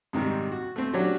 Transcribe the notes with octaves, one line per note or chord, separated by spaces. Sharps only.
G#2 C3 D#3 G3
F#4
A3 C4
F#3 C#4 D4 F#4 G4